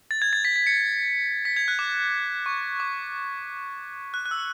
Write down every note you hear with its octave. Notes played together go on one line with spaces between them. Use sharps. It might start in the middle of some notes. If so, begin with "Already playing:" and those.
A6
G#6
A6
B6
B6
C#7
B6
G#6
F#6
D6
C#6
D6
F#6
F#6
E6